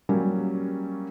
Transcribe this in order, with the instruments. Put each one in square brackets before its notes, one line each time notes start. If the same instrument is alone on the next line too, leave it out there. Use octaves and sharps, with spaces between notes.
[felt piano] F#3 G3 A#3 C#4